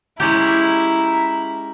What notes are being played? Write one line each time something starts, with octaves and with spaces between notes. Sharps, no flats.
G#3 C#4 E4 G4 A#5